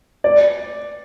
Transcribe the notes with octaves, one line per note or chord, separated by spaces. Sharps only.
D5